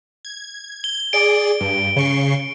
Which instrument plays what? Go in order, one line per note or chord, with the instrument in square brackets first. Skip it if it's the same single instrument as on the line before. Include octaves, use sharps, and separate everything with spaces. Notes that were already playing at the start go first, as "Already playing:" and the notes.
[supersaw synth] G#6
[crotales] G7
[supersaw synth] G#4 D5 [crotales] D7
[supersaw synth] G2
C#3 C#6 C7